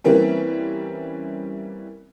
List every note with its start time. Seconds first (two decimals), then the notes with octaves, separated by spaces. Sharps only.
0.04 E3 G3 A#3 C4 C#4